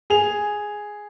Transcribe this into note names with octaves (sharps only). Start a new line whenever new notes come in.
G#4 F7